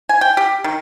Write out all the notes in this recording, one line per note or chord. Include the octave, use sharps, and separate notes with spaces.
G#5
G5
G4
D#3